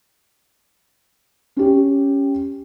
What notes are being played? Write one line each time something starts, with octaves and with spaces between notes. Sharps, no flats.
C#4 G4